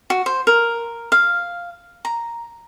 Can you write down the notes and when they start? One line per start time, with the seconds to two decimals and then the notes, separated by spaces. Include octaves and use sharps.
0.10 F#4
0.26 C5
0.47 A#4
1.12 F5
2.05 A#5